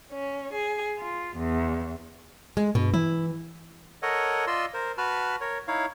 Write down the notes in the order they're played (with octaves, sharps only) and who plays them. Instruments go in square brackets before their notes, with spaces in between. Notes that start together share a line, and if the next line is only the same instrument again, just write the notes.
[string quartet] C#4
G#4
F4
E2
[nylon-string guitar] G#3
[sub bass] G2 [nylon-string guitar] B2
[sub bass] E3 [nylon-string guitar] E4
[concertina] A4 A#4 C#5 D#5 F#5
F4 D5 D#5 C6 E6
A#4 C5
F#4 B4 A5 B5 F6
A#4 C#5
D#4 E4 C#5 F5